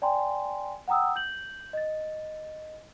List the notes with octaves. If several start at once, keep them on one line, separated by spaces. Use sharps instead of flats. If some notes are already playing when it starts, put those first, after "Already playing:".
D5 G5 G#5 A#5 C6
F#5 G5 A#5 D#6 E6
G6 F#7
D#5 A6